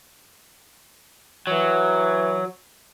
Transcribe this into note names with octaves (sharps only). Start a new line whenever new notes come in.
E3 F#3